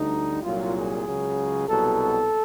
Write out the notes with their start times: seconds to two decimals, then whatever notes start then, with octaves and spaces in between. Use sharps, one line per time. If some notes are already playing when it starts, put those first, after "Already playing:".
Already playing: D2 D3 G3 D#4
0.42 C2 A#2 F#3 F4
0.74 G#4
1.05 C#2 C#3 F#3
1.68 C2 B2 F#3 A4